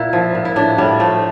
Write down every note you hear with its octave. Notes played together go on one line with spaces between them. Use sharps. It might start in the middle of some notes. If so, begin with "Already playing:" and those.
Already playing: A#2 E4
F3
A#2
E4
A2 D4
A2 G3
F3 A3